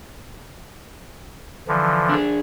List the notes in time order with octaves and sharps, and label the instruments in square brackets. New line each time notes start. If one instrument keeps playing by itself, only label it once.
[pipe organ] D3 E3 F3
[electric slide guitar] D4 G#4